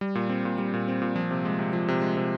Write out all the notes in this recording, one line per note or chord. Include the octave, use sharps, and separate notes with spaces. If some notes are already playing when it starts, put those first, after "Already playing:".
G3
A#2
C4
A#2
G3
A#2
C4
A#2
F3
C3
G#3
C3
F3
C3
G#3
C3